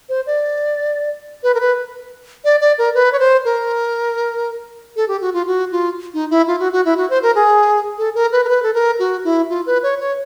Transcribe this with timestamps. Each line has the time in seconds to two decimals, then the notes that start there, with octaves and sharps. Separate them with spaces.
0.09 C5
0.27 D5
1.43 B4
1.54 A#4
1.60 B4
2.45 D5
2.61 D5
2.78 A#4
2.95 B4
3.12 C#5
3.19 C5
3.45 A#4
4.96 A4
5.08 G4
5.21 F#4
5.33 F4
5.47 F#4
5.72 F4
6.14 D#4
6.30 E4
6.47 F4
6.60 F#4
6.72 F#4
6.85 E4
6.97 F#4
7.10 C5
7.23 A#4
7.35 G#4
7.98 A4
8.15 A#4
8.32 B4
8.44 A#4
8.49 B4
8.63 A4
8.74 A#4
8.99 F#4
9.24 E4
9.49 F4
9.66 B4
9.83 C#5
10.00 C#5